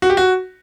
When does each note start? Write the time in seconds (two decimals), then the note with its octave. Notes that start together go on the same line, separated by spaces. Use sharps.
0.02 F#4
0.10 G4
0.17 F#4